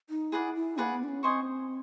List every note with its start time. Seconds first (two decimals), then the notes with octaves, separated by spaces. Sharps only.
0.10 D#4
0.32 E4 G#4 B4 D5 F#5
0.55 E4
0.78 A#3 G#4 B4 D5 F#5
0.93 B3
1.04 D4
1.08 C#4
1.23 C4 C5 D#5 G#5 C#6